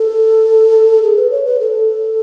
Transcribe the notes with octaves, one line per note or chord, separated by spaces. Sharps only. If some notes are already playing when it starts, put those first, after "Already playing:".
Already playing: A4
G#4
B4
C#5
B4
A4